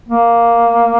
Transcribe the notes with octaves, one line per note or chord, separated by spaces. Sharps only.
A#3